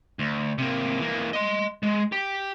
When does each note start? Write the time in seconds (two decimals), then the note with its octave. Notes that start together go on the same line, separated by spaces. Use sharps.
0.19 D2
0.58 C3 A#3
0.99 E3 A#3
1.33 D#5 C6
1.83 G#3
2.12 G4 G5